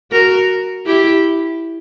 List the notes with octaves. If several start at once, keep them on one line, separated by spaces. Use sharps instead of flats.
F#4 A#4
E4 G4